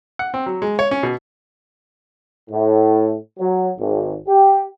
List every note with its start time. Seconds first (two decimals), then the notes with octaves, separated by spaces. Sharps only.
0.19 F#5
0.34 C4
0.46 F#3
0.62 G#3
0.79 C#5
0.91 C#4
1.03 B2
2.50 A2
3.38 F#3
3.78 G#1
4.27 G4